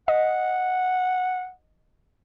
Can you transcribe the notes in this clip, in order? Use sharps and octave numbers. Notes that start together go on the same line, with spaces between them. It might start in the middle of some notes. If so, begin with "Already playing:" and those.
D#5 F#5